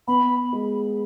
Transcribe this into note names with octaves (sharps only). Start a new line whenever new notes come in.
B3 B5
G#3